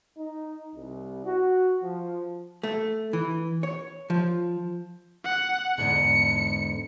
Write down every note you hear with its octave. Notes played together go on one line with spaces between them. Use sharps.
D#4
C2
F#4
F3
A3
E3
C#5
F3
F#5
E2 G#2 D3 C#7